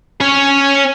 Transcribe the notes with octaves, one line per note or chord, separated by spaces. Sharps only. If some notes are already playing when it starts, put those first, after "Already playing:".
C#4 C#5